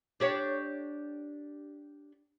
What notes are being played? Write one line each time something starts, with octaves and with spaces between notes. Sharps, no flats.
D4 G4 C#5